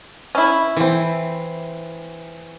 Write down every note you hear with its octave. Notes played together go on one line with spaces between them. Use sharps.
C#4 E4
E3 C4